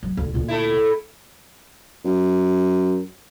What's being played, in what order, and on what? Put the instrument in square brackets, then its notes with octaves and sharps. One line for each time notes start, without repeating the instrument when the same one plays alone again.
[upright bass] F#3
D2
D2 A#2
[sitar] A3 E4
[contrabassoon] F#2